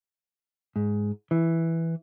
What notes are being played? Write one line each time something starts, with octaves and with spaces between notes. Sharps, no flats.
G#2
E3